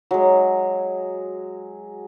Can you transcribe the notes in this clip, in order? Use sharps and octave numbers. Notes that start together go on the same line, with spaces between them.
F#3 G#3